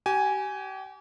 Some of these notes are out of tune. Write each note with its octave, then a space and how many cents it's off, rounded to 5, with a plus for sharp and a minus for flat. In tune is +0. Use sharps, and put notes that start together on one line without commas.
G4 -40 G#5 +0